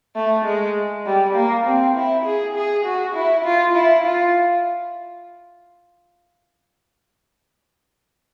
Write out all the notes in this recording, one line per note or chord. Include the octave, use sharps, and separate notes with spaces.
A3
G#3
G3
A#3
C4
E4
G#4
G#4
F#4
E4
F4
E4
F4